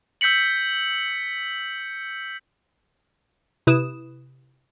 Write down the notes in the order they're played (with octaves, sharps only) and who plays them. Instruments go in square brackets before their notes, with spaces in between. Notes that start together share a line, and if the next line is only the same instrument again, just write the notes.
[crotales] E6 G6 B6 C#7 F#7
[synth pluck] C3 E4 B4 D#6 E7